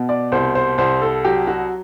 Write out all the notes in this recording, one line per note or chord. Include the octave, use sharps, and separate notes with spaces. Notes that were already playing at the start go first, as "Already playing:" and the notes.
Already playing: B2
D5
C2 C5
C5
C2 C5
A4
F#3 G4
F#4